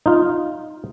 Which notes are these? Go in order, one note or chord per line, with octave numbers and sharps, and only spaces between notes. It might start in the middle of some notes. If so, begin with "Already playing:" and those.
D#4 F4